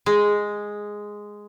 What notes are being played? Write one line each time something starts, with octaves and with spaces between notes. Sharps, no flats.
G#3